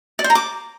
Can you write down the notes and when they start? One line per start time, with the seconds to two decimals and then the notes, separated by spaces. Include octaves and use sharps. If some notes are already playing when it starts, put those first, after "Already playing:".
0.19 D5
0.24 C5
0.30 A#5
0.35 D6